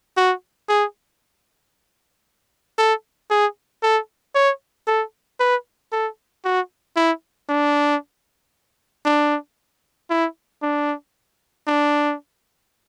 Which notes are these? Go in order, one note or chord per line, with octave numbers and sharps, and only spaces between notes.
F#4
G#4
A4
G#4
A4
C#5
A4
B4
A4
F#4
E4
D4
D4
E4
D4
D4